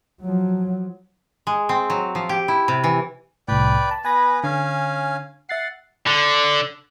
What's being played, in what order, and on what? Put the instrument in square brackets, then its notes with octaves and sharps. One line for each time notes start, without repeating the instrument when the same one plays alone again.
[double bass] F3 F#3
[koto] G#3
C4
F#3
F3
G4
E4
C3
E3
[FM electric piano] C2 A2 [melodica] B4 D5 G5
[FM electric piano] A5
[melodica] B3 B4 [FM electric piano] G#5 A#6
[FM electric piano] D3 [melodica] C#4 F5 G#5
[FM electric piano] E5 A6 C7 [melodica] F#5
[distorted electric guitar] D3